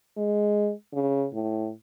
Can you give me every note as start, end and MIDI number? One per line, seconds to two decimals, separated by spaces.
0.17 0.72 56
0.94 1.26 49
1.33 1.70 45